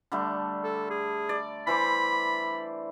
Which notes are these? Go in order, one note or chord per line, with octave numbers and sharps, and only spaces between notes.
D3 G3 A3
A4
G#4
D5
E3 C5 B5 D6